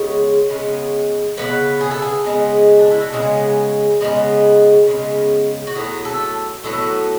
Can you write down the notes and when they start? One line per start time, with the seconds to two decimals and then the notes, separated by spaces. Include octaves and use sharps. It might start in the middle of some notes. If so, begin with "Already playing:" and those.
Already playing: C#3 G#3 B3 C#5
0.50 C#3 G#3 B3
1.37 C#3 G#3 B3 B4
1.81 G#4
1.91 A4
2.02 G#4
2.25 C#3 G#3 B3
2.79 D4
2.91 E4
3.01 F#4
3.12 C#3 G#3 B3 G#4
4.01 C#3 G#3 B3
4.88 C#3 G#3 B3
5.67 F#4
5.75 A2 F#3 B3 G#4
6.05 A4
6.64 A2 F#3 B3 A4